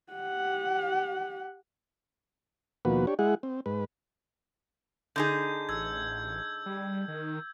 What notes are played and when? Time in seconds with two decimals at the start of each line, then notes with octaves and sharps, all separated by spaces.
0.12 G4 F#5
2.85 D#2 B2 F3 A#3 F#4 B4
3.07 D4 G4 C#5
3.19 G#3 E4 G#4 F#5
3.43 C4
3.66 G#2 B4
5.16 D3 D#4 G#4 G6
5.69 A1 E6 G#6
6.66 G3
7.08 D#3